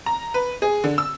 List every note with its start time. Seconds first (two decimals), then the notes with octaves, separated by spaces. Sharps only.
0.06 A#5
0.34 B4
0.62 G#4
0.84 D3
0.98 E6